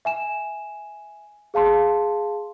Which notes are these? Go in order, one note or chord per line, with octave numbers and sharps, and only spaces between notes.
E5 G#5 E7
G#4 F5 A5 C6